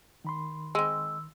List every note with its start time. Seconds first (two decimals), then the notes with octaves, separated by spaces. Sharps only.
0.24 D#3 B5 C6
0.75 G#3 C4 E6